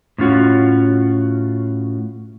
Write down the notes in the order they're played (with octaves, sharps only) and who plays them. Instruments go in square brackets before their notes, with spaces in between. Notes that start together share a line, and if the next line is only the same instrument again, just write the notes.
[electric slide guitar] A2 C#4 F4 F#4